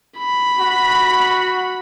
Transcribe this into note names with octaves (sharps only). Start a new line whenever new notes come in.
B5
F#4